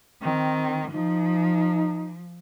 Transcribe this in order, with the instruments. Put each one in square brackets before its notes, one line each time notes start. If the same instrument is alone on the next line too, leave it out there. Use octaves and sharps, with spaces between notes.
[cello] D#3 [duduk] C4
[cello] F3 [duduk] D#4